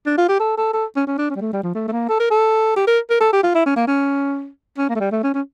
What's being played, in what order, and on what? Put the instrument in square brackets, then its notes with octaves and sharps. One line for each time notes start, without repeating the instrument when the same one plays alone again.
[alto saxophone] D4
F4
G4
A4
A4
A4
C#4
C#4
D4
C#4
G3
A3
G3
F3
A3
A3
A#3
A4
A#4
A4
G4
A#4
A#4
A4
G4
F4
E4
C#4
A#3
C#4
C#4
A#3
A3
G3
A3
C#4
C#4